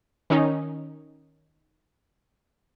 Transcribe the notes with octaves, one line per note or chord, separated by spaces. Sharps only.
D#3 C#4 D#4